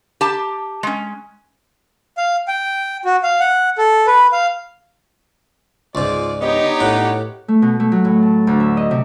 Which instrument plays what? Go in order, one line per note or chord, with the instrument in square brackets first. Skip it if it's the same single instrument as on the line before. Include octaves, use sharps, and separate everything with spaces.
[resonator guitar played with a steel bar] G4 A5
G#3 C#4
[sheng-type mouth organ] F5
G5
F#4
F5
F#5
A4
B4
F5
[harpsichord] C#2 G#2 [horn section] F4 G#4 D5
[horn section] B3 D4 D#4 [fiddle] G4 C#5 [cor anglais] D#5
[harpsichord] A2 [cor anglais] F#5
[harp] A3
B2
A3
F#3
A2
A5
D2
E5
D#5
C3